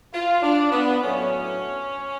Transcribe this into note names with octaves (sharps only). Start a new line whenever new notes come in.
F4
D4
B3
A2 F#3 A3 C#4